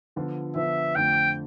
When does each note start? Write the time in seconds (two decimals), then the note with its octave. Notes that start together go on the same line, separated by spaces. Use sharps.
0.16 D3 F3 B3 F4
0.56 D3 F3 B3 F4 E5
0.96 F2 D3 F3 A3 G5